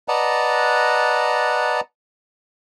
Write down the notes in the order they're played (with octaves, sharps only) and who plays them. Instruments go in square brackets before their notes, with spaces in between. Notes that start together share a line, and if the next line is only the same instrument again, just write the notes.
[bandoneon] B4 D5 D#5 F#5 A5 A#5